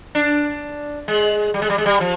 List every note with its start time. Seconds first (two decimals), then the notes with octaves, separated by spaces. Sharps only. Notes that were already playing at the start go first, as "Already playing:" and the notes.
0.15 D4
1.08 G#3
1.54 G3
1.62 G#3
1.70 G3
1.78 G#3
1.86 G3
2.00 F3